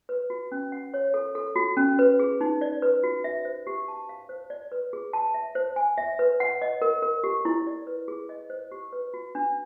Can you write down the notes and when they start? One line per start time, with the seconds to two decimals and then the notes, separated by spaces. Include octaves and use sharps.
0.09 B4
0.30 F#4
0.52 C#4
0.72 F#5
0.94 C#5
1.14 A4
1.35 A4
1.56 F#4
1.77 C#4
1.99 B4
2.19 G#4
2.41 D#4
2.61 D5
2.82 B4
3.03 F#4
3.24 E5
3.45 C5
3.67 G4
3.88 A5
4.09 F5
4.29 C5
4.50 D5
4.72 B4
4.93 G#4
5.13 A5
5.34 E5
5.55 C5
5.76 G#5
5.98 E5
6.19 B4
6.40 F#5
6.62 D#5
6.82 A#4
7.03 A#4
7.24 G4
7.45 E4
7.67 D5
7.87 B4
8.08 G#4
8.29 D#5
8.50 C5
8.72 G4
8.93 B4
9.14 F#4
9.35 D4